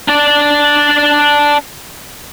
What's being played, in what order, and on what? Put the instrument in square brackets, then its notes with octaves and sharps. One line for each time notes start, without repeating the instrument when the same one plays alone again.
[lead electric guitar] D4 D5